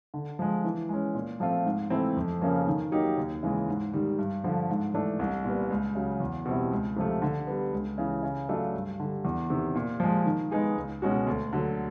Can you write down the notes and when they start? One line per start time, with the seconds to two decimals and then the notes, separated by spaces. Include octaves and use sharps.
0.14 D3
0.39 F3 G#3
0.64 E3
0.89 G#3 C#4
1.15 A#2
1.40 F3 A3 C4 F4
1.65 G#2
1.90 E3 A3 C4 E4
2.17 F2
2.41 C#3 F3 A#3 C#4
2.67 D#3
2.92 F#3 A#3 D#4 G4
3.17 D#2
3.43 C#3 E3 G#3
3.68 G#2
3.93 D#3 G3
4.19 G2
4.44 D3 F3
4.69 G#2
4.94 E3 A3 D4
5.19 C2
5.45 A#2 G3 B3
5.70 C#2
5.95 C#3 F#3
6.20 E2
6.45 B2 G3 C4 E4
6.72 C#2
6.96 C3 F3 A3
7.22 D3
7.47 G3 B3
7.73 C#2
7.98 C#3 E3
8.23 C#3
8.49 F#3 A3 D4 F4
8.74 G2
9.00 D3 G3
9.25 E2
9.50 C3 D#3
9.75 A#2
10.00 F3 G#3
10.25 D#3
10.51 G#3 B3 D#4 G#4
10.76 C#2
11.02 B2 G#3 C#4 F#4
11.27 D2
11.53 D3 F#3